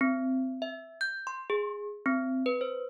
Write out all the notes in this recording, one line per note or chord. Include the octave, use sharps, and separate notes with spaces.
C4
E5
G6
C6
G#4
C4
B4
C5